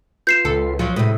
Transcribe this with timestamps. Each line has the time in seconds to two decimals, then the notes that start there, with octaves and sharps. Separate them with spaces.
0.27 F4 B4 C6 G6 C7 E7
0.45 C#2 A4
0.79 F3 F#3 F4
0.96 A2 C3 G#3 B5 D#6